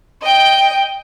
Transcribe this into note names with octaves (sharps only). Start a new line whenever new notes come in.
D#5 G5